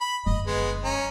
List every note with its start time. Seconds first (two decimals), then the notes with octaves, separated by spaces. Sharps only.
0.01 B5
0.26 F#1 D3 D#5
0.47 G#3 B3
0.84 C#4 A#5